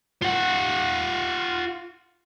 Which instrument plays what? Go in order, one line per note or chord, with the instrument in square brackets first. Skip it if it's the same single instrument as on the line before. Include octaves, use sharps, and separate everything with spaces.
[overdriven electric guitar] F4 F#5